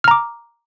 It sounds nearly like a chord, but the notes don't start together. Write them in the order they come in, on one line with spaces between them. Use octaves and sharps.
F6 A#5 D6